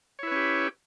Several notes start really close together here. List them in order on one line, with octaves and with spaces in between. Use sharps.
C#5 E4 B4 C#4 G4